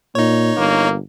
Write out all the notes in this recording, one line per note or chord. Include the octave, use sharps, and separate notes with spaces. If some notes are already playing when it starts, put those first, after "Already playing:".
A#2 D#4 C#5
G1 A#3